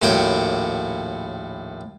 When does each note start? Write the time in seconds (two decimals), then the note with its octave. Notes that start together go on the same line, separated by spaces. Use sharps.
0.02 A#1 D#2 A2 F#4 C#5 G5